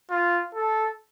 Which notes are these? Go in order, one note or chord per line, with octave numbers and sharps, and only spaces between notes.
F4
A4